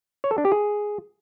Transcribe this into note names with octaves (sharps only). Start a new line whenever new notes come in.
C#5
A4
D4
G4
G#4